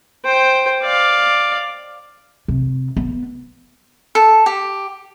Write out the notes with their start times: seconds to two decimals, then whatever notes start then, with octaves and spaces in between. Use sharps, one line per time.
0.25 C5 G5
0.82 D5 F5
2.48 C3
2.97 B3
4.15 A4
4.46 G4